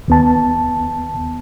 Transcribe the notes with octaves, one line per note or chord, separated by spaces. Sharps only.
D#2 B3 A5